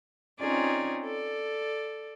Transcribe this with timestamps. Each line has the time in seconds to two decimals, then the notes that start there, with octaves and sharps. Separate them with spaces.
0.39 C4 C#4 D#4 F4 G#4 D5
1.03 A4 D5